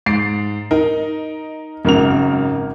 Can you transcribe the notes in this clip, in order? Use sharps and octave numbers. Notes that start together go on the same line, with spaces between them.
G#2 A6 C7 D7
D#4 A#4
G#1 F#2 C#3 A#4 F7